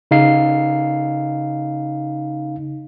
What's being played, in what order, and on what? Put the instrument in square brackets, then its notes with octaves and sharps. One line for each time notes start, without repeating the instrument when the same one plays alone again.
[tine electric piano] C#3 D#4 F5 C7